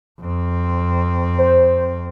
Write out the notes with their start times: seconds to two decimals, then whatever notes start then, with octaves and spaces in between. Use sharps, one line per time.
0.22 F2 C4
1.38 C5